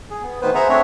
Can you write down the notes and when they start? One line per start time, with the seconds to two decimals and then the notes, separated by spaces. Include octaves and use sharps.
0.10 G#4
0.22 B3
0.41 D2 D#3 B3 B4 C5
0.55 G#4 C5 E5 F#5 A#5
0.69 A3 C4 D4 C#5 E5